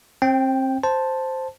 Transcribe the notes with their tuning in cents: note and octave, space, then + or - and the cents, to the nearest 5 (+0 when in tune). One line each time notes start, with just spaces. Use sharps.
C4 +30 G5 +0
C5 +0 A5 +0